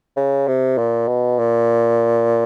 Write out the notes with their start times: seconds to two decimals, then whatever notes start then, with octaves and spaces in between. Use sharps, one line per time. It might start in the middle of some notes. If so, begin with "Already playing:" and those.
0.17 C#3
0.48 C3
0.78 A#2
1.08 B2
1.39 A#2